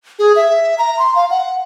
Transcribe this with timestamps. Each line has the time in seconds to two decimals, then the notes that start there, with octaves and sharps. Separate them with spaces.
0.19 G#4
0.36 E5
0.78 A#5
0.99 C6
1.15 F5
1.31 F#5